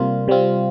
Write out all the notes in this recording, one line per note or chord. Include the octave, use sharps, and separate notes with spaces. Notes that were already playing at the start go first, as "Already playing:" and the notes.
Already playing: C3 G3 A#3 F4
C3 G3 C4 F4